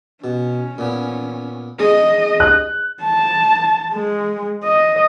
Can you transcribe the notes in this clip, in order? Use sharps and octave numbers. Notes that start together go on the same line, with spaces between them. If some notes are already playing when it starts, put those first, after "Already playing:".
B2 C#4
A#2 B3
G#3 G#4 D#5
F#6
A5
G#3
D#5